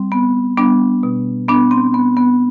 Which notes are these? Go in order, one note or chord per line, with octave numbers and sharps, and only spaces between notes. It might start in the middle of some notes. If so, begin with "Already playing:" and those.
Already playing: G3 C4
B3
G3 B3 D4
B2
B3 D4
C4
B3
B3